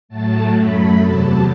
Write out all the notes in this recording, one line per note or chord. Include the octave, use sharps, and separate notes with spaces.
A2 F#3 A3 A5
F#2 F#3 A3 B5
E2 C3 F#3 A5